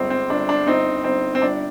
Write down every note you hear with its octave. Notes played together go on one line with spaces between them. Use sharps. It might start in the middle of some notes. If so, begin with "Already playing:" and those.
Already playing: G1 G#3 C4
C4
G1 D4
D4
G1 C4 D#4
G1 C4
C4
G1 D4